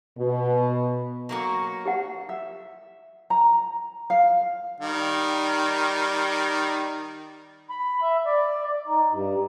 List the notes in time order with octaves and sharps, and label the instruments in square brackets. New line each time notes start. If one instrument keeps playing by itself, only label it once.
[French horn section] B2
[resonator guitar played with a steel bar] F#3 A#3 F#4
[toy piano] G4 F#5
[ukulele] E5
A#5
F5
[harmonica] D#3 G3
[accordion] B5
E5
D5
D#4
G2